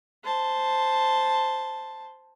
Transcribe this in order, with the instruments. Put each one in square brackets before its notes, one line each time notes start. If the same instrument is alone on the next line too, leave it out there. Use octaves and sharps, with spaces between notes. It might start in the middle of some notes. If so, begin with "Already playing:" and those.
[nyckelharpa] C5 A5